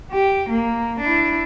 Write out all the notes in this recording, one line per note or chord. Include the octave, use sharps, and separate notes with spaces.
G4
A#3
D4 E4